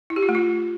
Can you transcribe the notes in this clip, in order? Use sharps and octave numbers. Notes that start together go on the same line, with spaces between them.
E4
G4
F4
A3
F4